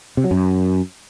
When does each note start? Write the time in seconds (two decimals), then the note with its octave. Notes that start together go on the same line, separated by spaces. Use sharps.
0.17 C3
0.24 F#3
0.31 F#2